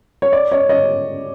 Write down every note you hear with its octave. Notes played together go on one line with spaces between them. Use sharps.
C#5
D5
C#5 D#5
C#5 D#5